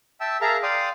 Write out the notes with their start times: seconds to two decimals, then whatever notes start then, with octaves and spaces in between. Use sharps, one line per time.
0.21 E5 G5 A5 E6
0.41 G#4 A#4 E5 F5 A5 A#5
0.63 D5 F5 G5 C6 D6 D#6